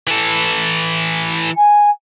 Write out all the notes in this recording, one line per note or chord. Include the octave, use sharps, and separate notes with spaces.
E3 A4
G#5